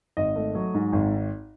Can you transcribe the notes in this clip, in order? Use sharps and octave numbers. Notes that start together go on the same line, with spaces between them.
G#1 D#5
A3
F#3
G#2
G#1